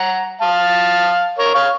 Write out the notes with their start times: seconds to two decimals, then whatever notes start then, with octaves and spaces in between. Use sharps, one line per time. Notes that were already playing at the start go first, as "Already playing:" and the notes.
Already playing: F#5 A#5
0.41 F5 A5
1.38 A#4 C#5
1.54 C#5 F5